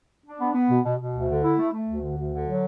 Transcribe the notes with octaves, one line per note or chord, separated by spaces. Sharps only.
D4
B3
B3
B2
B2
B2
D2
D3
E4
A3
A3
D2
D3
D2
D3
F#3